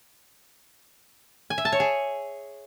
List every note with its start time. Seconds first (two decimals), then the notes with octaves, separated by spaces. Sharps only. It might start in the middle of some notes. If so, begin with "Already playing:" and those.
1.50 G#5
1.58 E5
1.65 A5
1.72 C#5
1.80 G#4